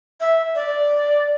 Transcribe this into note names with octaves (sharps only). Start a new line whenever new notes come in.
E5
D5